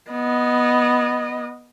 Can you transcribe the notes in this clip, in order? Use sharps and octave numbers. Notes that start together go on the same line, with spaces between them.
B3 D#5